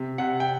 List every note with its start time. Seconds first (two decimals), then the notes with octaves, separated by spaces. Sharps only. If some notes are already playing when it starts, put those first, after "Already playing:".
Already playing: C3
0.18 C3 F#5
0.40 G5